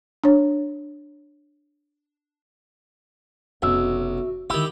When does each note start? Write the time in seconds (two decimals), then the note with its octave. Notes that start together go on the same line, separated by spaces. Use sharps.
0.24 D4 C#5
3.62 F1 B1 C#4 F#4 E5
4.50 D3 D#3 E4 G4